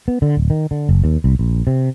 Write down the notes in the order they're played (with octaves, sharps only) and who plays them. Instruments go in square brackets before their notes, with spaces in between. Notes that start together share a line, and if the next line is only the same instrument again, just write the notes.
[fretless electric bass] B3
D3
D1
D#3
D3
F#1
D#2
C2
A#1
C3